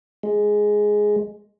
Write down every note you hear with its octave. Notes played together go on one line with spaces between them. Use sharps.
G#3